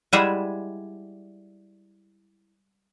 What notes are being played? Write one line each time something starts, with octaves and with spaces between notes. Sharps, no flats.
G3 G#3 E4 G#4 E5 F#5